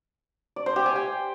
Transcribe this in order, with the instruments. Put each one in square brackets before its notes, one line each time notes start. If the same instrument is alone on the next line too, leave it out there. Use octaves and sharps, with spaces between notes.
[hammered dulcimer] D5
C5
G4
G#5
G5